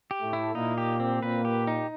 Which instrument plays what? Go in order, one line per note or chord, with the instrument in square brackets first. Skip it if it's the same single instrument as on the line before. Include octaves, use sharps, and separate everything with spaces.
[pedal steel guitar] G4
[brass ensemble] A2 A3
[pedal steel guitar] E4
[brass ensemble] A#2 A#3 [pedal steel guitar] D#4
[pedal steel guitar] G4
C4
[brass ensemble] A#2 A#3 [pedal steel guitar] B4
[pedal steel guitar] G4
D#4